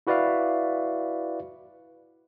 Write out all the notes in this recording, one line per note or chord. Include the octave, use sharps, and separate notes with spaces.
E4 F#4 B4 D5 E5 F5